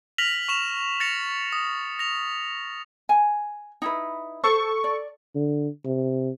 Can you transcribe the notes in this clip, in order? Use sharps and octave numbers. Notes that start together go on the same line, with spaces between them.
F6 A#6 B6 F7 F#7
C#6 E7 F7
A6 A#6 C#7 F7
D#6
A#6 F7
G#5
D#4 E4 B4
A4 C5 C#6
D5
D3
C3